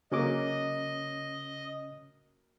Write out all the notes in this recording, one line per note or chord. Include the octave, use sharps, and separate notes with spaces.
C#3 F#3 A#3 C#4 D#5 D6